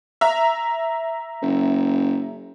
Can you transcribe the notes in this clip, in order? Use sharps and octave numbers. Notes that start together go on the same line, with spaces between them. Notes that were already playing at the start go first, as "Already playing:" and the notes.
E5 A#5
F#1